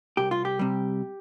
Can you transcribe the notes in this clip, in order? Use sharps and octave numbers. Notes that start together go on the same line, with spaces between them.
C2 G4
F4
G4
C3 G3